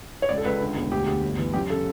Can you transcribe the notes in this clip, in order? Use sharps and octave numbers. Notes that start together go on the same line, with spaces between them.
C#5
C#2 D5
A4
C#2 B4
D3
E1
D2 G4
D2
G1
E3
F#2 G4
C#3 A4